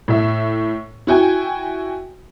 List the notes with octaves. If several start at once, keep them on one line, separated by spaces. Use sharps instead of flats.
A2 E5
E4 F#4 G5 G#5